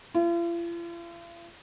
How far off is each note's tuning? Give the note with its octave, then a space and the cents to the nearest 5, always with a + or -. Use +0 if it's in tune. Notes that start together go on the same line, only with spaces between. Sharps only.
F4 -45